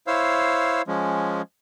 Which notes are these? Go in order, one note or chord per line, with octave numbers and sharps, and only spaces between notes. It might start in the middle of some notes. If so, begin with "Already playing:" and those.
E4 C5 C#5 F5 E6
F3 G#3 C#4